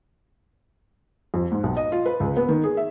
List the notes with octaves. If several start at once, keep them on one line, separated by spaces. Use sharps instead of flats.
F2
G#2
B1
D#5
F4
B4
C#2
B3
D#3
G#4
E5